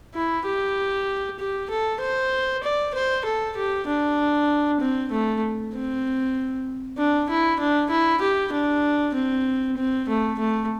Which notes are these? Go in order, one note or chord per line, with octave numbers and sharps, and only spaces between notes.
E4
G4
G4
A4
C5
D5
C5
A4
G4
D4
C4
A3
C4
D4
E4
D4
E4
G4
D4
C4
C4
A3
A3